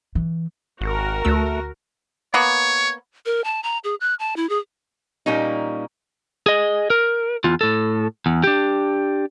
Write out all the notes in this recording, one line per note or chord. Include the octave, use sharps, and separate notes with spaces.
E3
G#1 F#4 A#4
D2 A3 E6
A#3 B3 C#5
A#4
A5
A#5
G#4
F#6
A5
E4
G#4
A#2 G3 A#3 C#4 D#4
G#4 D#5
A#4
E2 F4
A2 A4
E2
D4 G4